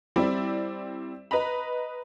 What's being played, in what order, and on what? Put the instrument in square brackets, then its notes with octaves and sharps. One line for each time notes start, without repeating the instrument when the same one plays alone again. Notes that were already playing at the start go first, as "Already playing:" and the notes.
[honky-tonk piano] G3 C4 E4 D5
B4 D#5 A#5 B5